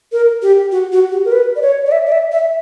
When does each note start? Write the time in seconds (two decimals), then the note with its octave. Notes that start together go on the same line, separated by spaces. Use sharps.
0.12 A#4
0.42 G4
0.72 F#4
0.92 F#4
1.12 G4
1.25 A#4
1.32 B4
1.56 D5
1.62 C#5
1.86 D5
1.92 E5
2.06 D5
2.12 E5
2.32 E5